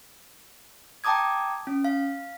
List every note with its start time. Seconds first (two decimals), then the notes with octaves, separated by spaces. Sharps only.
1.04 G5 A5 A#5 D6 D#6 G#6
1.67 C#4
1.84 F5